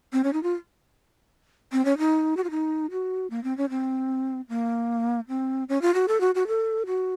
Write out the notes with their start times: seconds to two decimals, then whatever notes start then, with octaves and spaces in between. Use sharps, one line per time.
0.13 C4
0.24 C#4
0.33 D#4
0.43 F4
1.72 C4
1.85 C#4
1.98 D#4
2.37 F#4
2.44 F4
2.51 D#4
2.91 F#4
3.30 A#3
3.44 C4
3.57 C#4
3.70 C4
4.49 A#3
5.28 C4
5.69 C#4
5.82 F4
5.94 F#4
6.08 A4
6.21 F#4
6.35 F#4
6.47 A4
6.87 F#4